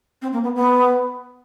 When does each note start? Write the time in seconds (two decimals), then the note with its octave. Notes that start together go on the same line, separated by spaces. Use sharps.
0.22 C4
0.33 A#3
0.43 B3
0.56 B3